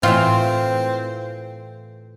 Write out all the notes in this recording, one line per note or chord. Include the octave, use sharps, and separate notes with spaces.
A2 E3 C4 F4 E5